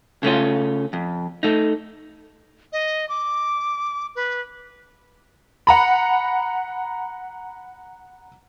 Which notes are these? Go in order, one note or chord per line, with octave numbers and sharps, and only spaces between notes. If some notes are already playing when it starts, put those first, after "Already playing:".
C#3 A3 C#4 F4
F2
A3 D#4
D#5
D6
B4
F#5 A#5 B5